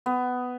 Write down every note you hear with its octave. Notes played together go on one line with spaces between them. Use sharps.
B3